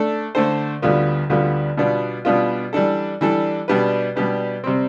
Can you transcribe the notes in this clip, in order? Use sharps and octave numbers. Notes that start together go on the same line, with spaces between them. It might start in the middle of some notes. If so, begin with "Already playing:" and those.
Already playing: A3 D4 A4
D3 A3 D4 A4 C5
D2 D3 G3 B3 F4
D2 D3 G3 B3 F4
B2 G3 B3 D4 F4
B2 G3 B3 D4 F4
E3 G3 D4 A4
E3 G3 D4 A4
B2 G3 D4 G4 B4
B2 G3 D4 G4 B4
C3 G3 C4